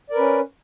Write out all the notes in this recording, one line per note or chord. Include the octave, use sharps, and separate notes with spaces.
C#4 A#4 B4 D5